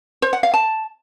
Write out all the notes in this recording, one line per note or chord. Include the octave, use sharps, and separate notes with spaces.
C5
F#5
F5
A5